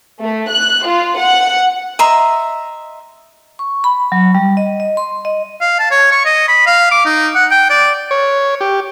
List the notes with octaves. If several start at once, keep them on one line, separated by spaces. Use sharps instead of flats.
A3
F#6
F4
F#5
D#5 E5 A#5 C6
C#6
B5
F#3
G3
D#5
D#5
C6
D#5
F5
A5
C#5
C#6
D#5
B5
F5
D6
D#4
F#5
G5
D5
C#5
G4